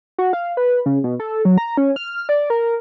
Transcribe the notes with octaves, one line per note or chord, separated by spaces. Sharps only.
F#4
F5
B4
C#3
B2
A4
F#3
A#5
C#4
F6
D5
A#4